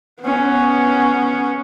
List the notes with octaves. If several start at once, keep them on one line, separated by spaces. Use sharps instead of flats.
B3 C#4